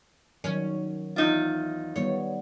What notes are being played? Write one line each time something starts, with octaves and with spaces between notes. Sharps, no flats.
D#3 F#3 C#4
E2 D#4 F4
D#3 G3 B3 C#5